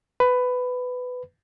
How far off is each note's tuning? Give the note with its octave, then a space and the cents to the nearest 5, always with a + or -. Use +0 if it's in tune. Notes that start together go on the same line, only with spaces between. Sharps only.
B4 +15